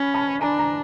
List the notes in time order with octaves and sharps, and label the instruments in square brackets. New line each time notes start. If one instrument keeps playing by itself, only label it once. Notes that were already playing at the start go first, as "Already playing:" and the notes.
Already playing: [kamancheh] C#4 [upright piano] B5
[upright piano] A5 B5
[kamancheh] D4 [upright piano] G#5 A#5
[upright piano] G#5 A#5